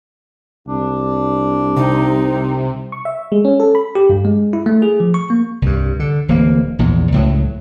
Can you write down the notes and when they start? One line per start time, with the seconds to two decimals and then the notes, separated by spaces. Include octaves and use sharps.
0.67 C2 D4
1.76 C3 D#4
2.92 C#6
3.05 E5
3.32 G#3
3.45 C#4
3.60 A4
3.75 B5
3.95 G4
4.10 G2
4.25 G#3
4.53 E4
4.66 A3
4.82 G#4
5.00 F3
5.14 C#6
5.30 A#3
5.62 C2 G2
6.00 D3
6.28 D1 E3 A#3
6.79 A#1 E2 G#2
7.12 C#2 A2 F#3